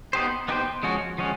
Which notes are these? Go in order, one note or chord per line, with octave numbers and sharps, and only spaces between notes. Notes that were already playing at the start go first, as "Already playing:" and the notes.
B3 D#4 G4 C5
B3 D#4 G4 C5
F3 G#3 C#4 F#4
F3 G#3 C#4 F#4